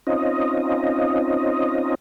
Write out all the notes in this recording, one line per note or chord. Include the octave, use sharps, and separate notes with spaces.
C4 C#4 D#4 F4 D#5